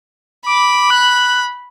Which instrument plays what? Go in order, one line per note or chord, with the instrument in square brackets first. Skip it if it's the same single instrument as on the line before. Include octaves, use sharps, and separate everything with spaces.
[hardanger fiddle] B5 [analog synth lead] D6
[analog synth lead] F#6